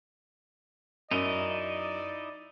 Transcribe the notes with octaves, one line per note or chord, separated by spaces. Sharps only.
F#2 D#4 E4 D5 D#5